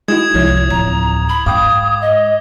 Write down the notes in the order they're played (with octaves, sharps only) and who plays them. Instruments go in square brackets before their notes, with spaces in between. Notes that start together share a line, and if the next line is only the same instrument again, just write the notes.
[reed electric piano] G#3 D#4 F#4 [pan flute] E4 [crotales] D#6 G#6 E7
[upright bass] C2 [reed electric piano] F3 E4 [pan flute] C#5
[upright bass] D1 [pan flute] A#5
[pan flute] B5
[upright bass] G#2 [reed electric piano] F5 G5 [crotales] D6 [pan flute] D#6
[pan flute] D#5